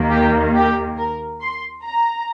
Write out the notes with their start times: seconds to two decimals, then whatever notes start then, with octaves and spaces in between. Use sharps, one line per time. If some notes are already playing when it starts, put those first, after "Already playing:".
Already playing: D#2 D#3 A#3
0.10 G4
0.54 G4
0.97 A#4
1.41 C6
1.84 A#5